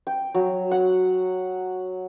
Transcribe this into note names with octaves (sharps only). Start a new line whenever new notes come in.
G5
F#3
F#5